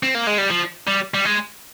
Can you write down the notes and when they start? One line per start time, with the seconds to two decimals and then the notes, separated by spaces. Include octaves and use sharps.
0.03 C4
0.15 A#3
0.27 G#3
0.38 G3
0.50 F3
0.87 G3
1.14 G3
1.25 G#3